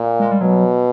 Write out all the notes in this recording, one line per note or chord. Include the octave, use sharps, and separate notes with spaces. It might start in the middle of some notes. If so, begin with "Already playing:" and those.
Already playing: A#2
G#3
G3
B2 F#3